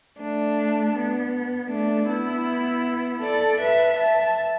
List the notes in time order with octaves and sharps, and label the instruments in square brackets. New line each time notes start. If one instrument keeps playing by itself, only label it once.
[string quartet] A3 D4
B3
A3 D4
B3 E4
A4 D5
B4 E5
E5 A5